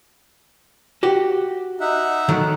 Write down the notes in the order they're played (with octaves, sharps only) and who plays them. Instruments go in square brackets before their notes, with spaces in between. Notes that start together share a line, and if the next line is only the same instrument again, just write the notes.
[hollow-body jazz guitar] F#4 G4
[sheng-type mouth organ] D#4 E5 F#5
[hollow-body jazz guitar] D#3 F#3 A3